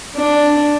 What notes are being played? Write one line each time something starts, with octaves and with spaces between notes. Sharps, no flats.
D4